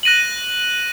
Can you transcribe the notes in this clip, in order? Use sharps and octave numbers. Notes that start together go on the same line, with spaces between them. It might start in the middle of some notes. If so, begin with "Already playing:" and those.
F#6 A#6 D#7 F#7